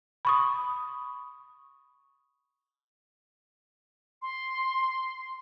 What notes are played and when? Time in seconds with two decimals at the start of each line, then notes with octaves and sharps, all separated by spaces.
0.25 B5 C#6 D#6
4.22 C6